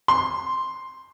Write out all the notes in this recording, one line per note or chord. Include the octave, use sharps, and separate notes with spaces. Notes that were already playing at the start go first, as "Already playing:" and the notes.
C6